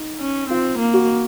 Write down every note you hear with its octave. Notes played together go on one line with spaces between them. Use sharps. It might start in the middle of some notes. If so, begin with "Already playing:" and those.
Already playing: D#4
C#4
C4 F4
A#3
F#4